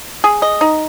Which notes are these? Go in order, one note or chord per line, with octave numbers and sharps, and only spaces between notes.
G#4
D#5
D#4